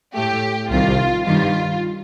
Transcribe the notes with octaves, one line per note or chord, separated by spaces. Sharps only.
A2 A3 G4
C2 C3 D#3 G3 F4
G2 D#3 G3 F4